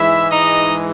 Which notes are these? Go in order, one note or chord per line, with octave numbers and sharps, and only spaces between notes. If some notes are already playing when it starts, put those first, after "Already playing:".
Already playing: G#2 E3 G#3 E4 E5
D#4 D#5